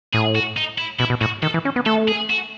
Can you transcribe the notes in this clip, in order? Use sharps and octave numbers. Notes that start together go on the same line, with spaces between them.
A2 G#4
F#4
D#4
E4
B2 E4
B2
A2 F#4
D#3 A4
E3
C#4
B3
A3 A4
G#4
F#4